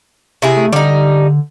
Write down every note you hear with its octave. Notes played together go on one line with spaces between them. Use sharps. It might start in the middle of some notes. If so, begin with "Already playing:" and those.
C3 E4 G#4
A3
D3 G3 D#4